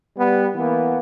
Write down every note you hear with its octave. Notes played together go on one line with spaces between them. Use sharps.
G3 B3
E3 A#3 B3